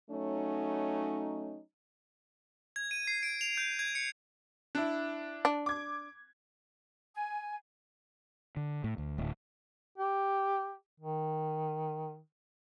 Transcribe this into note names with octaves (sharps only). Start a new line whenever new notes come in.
F#3 A3 C#4 D#4
G#6
D#7
C7
D7
F7
G6
G#6
C#7
D4 E4
D4
D6 G#6
G#5
D3
A2
D2
D1
G4
D#3